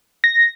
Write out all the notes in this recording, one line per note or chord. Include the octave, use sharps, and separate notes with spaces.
A#6